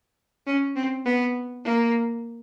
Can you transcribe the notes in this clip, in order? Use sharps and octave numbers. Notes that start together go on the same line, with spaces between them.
C#4
C4
B3
A#3